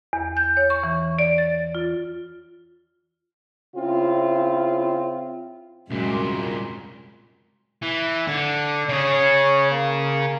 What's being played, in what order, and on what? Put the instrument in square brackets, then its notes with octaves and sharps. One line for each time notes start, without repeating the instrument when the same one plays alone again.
[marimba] E2
G6
C#5
C#6
E3
D5
A6
F4
[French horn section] C#3 C4 E4 F4
[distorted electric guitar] C2 A#2 [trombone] F#2 [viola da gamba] G#3
[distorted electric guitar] E3
D3
[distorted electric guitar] C#3 G#4 [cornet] C#5
[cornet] A#3